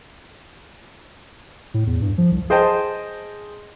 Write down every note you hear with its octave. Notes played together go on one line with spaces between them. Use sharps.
A2
E2
G2
F3
C2
G#4 C5 D#5 G5 A5